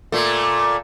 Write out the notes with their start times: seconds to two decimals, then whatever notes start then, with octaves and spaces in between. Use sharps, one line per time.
0.12 A#2 A3